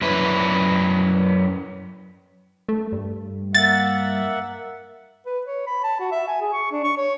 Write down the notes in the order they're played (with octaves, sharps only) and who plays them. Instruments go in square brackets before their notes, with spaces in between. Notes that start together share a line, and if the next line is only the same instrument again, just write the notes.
[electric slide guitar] F#2 E4 B4
[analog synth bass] A3
G2
[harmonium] A#3 E5 F#5 [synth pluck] A6
[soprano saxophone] B4
C#5
B5
A5
F#4
E5
G#5
G#4
C#6
D4
C#6
C#5